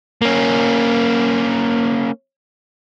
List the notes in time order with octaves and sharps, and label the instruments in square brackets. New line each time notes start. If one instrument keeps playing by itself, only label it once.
[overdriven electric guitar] A#3 C#4